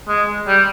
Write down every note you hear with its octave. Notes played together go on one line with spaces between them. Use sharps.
G#3
G3